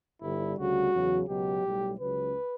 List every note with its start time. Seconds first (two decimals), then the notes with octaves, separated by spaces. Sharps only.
0.22 G1 G2 D3 G3 E4
0.58 D2 C#3 G3 F#4
0.93 E2 C#3 F#3
1.28 C#2 B2 F#3 G4
1.64 B1 A2 G3
1.99 C#2 C#3 F#3 B4